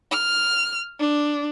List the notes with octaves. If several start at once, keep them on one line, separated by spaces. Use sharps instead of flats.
F6
D4